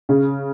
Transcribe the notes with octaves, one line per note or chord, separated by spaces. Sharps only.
C#3